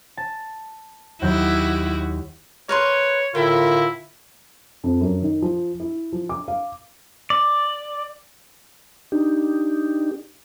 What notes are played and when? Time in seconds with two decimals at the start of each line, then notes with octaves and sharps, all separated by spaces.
0.17 A5
1.22 D#2 F#3 E4 F#4 G4 G6
2.69 A#4 B4 C#5 C6
3.35 A2 D3 E4 F4 A#4 G5
4.84 F2
5.01 F#2
5.22 D#3
5.42 F3
5.80 E4
6.12 F3
6.29 D6
6.48 F5
7.30 D5
9.12 D4 D#4 G4